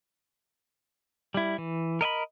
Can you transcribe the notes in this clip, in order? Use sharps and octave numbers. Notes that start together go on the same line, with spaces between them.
G3 E4
E3
A#4 D#5 E5 B5